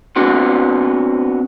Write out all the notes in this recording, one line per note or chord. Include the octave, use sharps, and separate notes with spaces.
B3 C4 D4 F#4